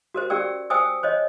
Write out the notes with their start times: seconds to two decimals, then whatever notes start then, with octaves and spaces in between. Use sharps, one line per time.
0.14 F#4 A#4 C5
0.30 C#4 G4 D5 G5 E6
0.70 C5 G5 G#5 D#6 E6
1.03 C5 C#5 D#5